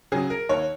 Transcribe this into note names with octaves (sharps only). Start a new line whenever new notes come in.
C#3 F#3 G#4
A#4
D#2 C#5